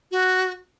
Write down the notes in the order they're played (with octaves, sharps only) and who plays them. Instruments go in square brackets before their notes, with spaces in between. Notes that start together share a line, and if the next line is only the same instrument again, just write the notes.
[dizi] F#4